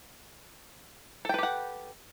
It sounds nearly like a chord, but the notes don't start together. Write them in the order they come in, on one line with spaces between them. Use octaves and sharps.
A4 G5 B4 G4 F#5